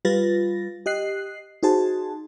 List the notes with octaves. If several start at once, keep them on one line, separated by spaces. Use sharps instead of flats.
G3 F4 B4 A6 A#6
G4 D#5 F#6 C7
D#4 F#4 G#4 C5 A5